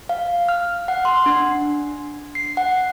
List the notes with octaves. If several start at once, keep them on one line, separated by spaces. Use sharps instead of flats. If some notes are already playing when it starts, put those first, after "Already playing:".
F5
F6
F#5
C6
D4
C7
F#5